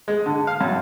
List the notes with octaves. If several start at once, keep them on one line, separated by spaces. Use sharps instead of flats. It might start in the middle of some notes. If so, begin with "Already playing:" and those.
G#3
D3
F5
F#2